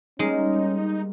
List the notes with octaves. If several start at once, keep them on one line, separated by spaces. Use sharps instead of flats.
G3 G#3 A#3 C#4 D#4